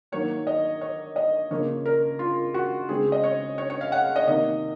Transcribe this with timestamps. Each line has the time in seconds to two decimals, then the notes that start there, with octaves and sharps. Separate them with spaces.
0.12 D#3 F#3 A#3 C#5
0.47 D#5
0.81 C#5
1.16 D#5
1.51 C#3 F3 A#3 C#5
1.86 A#4
2.19 F4
2.54 F#4
2.89 C#3 G#3 C4 G#4
3.12 D#5
3.23 C#5
3.58 C#5
3.70 C#5
3.81 F5
3.92 F#5
4.04 F5
4.16 D#5
4.27 C3 D#3 A#3 D#5